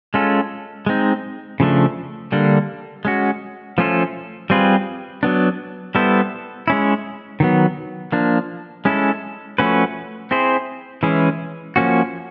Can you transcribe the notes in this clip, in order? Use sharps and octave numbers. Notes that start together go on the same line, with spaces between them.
G#3 C#4 F4 A4
G#3 C4 D#4
C#3 F3 A3 D4
D3 G3 A#3 D4
G#3 C#4 F#4
F3 A3 C#4 F4 A4
G3 C4 F4 G#4 B4
F#3 B3 D4
G3 B3 E4 A4 C5
G#3 C#4 E4
D#3 F#3 B3
F3 A#3 D4
G#3 C#4 E4 A4
F3 A3 C#4 F#4 B4
C4 E4 G#4 C5
E3 G#3 C#4 E4 G#4
F3 A#3 C#4 F#4